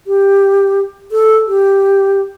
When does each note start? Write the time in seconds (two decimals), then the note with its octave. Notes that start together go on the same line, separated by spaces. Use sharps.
0.07 G4
1.12 A4
1.47 G4